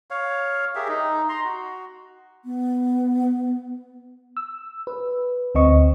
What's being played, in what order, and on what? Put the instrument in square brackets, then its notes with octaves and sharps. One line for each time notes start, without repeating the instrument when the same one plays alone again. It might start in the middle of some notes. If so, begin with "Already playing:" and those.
[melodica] C#5 F5
G4 G#4 A#4 E5
D#4
A#5 C6
F#4
[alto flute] B3
[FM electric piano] E6
B4
D2 C4 D#5 C#6